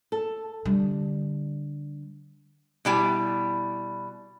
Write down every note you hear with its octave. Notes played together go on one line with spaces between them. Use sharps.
A4
D3 G3
B2 G3 E4 G#5